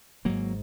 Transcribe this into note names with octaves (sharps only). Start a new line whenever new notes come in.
G#1 G#2 F#3 A#3